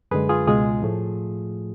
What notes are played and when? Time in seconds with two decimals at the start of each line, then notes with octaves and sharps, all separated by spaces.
0.11 F#2 D3 G#3 G#4 B4
0.29 F4 G#4
0.47 C#2 B2 G#3 F4 G#4
0.82 A2 F3 A3